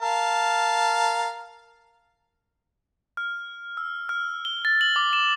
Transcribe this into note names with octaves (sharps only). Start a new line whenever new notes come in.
A#4 F5 A5
F6
E6
F6
G7
A6
F#7
D6
E7